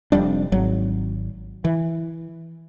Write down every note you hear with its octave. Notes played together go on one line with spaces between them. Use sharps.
F1 F2 G3 D4
G#1 F#3
E3